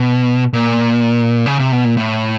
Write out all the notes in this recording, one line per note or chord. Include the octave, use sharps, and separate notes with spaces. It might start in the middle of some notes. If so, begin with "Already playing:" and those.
Already playing: B2
A#2
C#3
C3
B2
A#2
A2